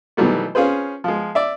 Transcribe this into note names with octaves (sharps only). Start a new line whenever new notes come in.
B2 D#3 E3 F#3 G3 A3
C#4 F4 G#4 B4 C5
F3 G#3
D5 E5